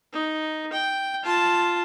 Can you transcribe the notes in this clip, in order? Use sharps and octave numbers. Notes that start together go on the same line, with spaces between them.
D#4
G5
F4 A5